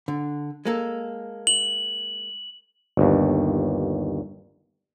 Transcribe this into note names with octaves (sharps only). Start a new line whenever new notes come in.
D3
G#3 A#3 A4
F#7
G1 D#2